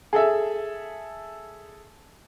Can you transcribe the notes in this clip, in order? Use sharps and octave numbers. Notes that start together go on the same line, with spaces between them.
G#4 A4 E5